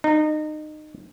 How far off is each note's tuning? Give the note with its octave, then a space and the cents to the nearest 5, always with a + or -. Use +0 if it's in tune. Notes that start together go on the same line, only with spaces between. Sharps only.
D#4 -25